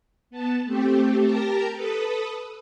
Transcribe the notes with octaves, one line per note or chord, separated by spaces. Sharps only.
B3 A5
A3 C4 G4
G4 A#4 A5 A#5
A4 B4 D#6